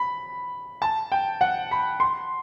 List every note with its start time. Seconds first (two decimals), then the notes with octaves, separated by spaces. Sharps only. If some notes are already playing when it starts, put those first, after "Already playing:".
Already playing: B5
0.82 A5
1.12 G5
1.41 F#5
1.71 B5
2.00 C6